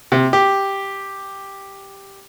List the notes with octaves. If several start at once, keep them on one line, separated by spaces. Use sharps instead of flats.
C3
G4